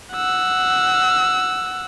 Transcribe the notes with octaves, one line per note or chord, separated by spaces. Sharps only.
F#5 E6